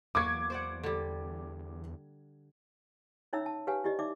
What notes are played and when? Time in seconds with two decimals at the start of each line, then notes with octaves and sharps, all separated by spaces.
0.15 E2 F#3 A#3 F#4 D6 G#6
0.50 C5 D5 F#5
0.83 D3 G3
3.33 C#4 D#4 C#5 E5 A#5 E6
3.46 A5
3.67 G4 B4 C#5 F5 G#5
3.84 E4 G4 D5 D#5
3.99 D#4 D5 E5 D6